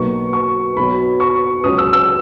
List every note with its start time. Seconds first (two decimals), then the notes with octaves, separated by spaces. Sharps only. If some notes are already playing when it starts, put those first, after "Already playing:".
Already playing: B1 B2 A#3 C#6
0.33 C#6
0.77 B1 B2 F#3 B5
1.20 C#6
1.64 C#2 C#3 F#3 D#6
1.78 E6
1.93 E6